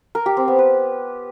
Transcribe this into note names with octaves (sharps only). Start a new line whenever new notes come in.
A#4
G4
C4
B3
B4